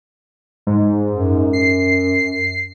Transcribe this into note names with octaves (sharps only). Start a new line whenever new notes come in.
G#2
F#2
C7